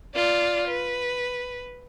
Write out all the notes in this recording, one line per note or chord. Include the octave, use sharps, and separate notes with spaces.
F4 D5
B4